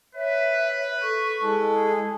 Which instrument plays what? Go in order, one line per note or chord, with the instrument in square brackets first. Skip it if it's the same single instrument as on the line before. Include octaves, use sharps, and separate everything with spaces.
[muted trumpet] B4 [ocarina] C#5 [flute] E5
[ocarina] A4 [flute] C#6
[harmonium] G#3 A4 [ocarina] E4
[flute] G#4